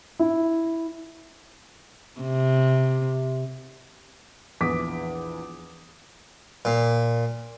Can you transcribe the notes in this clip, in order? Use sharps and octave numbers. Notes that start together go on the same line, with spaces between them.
E4
C3
A#1 E2 E3 D6 D#6 B6
A#2